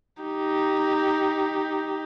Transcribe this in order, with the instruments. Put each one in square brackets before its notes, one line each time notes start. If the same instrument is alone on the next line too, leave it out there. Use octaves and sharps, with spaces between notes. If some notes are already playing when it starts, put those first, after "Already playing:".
[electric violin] D#4 G4